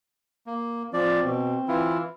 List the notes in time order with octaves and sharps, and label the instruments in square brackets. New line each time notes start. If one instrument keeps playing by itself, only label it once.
[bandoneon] A#3
[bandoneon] F3 D5 [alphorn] C4
[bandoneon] B2
E3 E4 F4